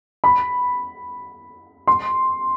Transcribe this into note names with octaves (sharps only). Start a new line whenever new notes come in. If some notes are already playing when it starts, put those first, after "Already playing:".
B5
C6